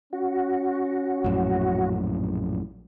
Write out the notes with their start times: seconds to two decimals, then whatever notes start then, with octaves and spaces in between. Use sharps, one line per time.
0.13 C#4 F#4
1.24 A#1 F#2 A2